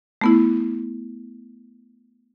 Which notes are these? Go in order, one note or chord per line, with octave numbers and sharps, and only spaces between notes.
A3 B3 E4